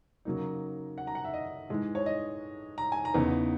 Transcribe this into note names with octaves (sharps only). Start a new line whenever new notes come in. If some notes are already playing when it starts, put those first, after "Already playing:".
C#3 F#3 A#3 D#4
F#5
A#5
F#5
E5
D#5
G#2 E3 G#3
C#5
D#5
A#5
G#5
A#5
E2 C#3 E3 B3 D#4